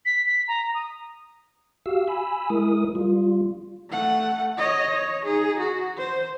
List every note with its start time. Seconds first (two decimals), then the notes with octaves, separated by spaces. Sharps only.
0.05 B6
0.27 B6
0.48 A#5
0.74 D#6
1.86 F#4 G4 F5 E6
2.08 G#5 B5 E6
2.50 G#3 E4 A#4 D#6
2.95 G3 F4
3.90 A3 F#5
4.58 C#5 D#5
4.90 C#5
5.25 D#4 G#4
5.59 F#4
5.97 C5